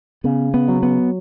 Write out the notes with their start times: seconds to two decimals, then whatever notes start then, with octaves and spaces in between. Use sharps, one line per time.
0.24 C#3 B3
0.54 B3
0.68 F#3
0.83 B3